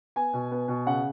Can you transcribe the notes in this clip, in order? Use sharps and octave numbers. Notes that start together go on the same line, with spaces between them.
B3 G#5
B2
B3
B2
C#3 F#5